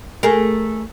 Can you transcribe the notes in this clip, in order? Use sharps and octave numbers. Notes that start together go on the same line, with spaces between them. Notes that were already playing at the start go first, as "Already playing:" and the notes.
A3 G#4 A#4